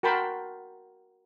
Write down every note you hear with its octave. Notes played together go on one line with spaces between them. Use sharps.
F#4 A#4 G5 A5 B5 C6